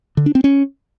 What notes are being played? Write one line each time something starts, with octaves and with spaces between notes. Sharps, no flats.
D3
D4
C4
C#4